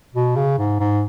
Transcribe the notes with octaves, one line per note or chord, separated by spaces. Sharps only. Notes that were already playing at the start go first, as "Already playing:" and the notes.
B2
C#3
G#2
G#2